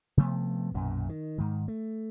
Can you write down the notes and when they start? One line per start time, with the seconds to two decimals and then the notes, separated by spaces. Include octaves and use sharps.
0.17 C3 F3 A3 B3
0.74 B1 F#2 A#2
1.09 D#3
1.38 G#2 D#3
1.68 A3